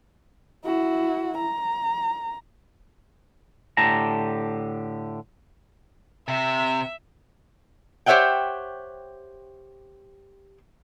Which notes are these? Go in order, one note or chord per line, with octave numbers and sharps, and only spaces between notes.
E4 F#4
A#5
A2 D3 G4 A5 A#5
C3 E5
G4 C5 C#5 E5 F#5 G5